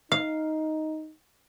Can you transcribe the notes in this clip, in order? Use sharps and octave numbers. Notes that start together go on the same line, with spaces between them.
D#4 F5